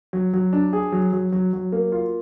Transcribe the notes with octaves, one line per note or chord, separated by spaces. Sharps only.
F#3
F#3
D4
G#4
F#3
F#3
F#3
F#3
A#3
F4